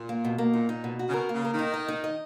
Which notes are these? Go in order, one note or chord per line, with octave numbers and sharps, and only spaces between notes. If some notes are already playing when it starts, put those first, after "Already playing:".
Already playing: A#2
A#3
B2
A#3
A#2 D#4
D#4
B2
F#4
C#3
B2 A#4
A#3
C#3
A#4
D#3 D#4
D#5
D#4
D#5